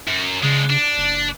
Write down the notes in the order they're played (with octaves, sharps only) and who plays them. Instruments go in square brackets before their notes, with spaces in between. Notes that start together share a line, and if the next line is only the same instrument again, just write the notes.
[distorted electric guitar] F#2
[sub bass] C#3 [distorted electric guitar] G#3 D4
[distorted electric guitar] D4
[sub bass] F#1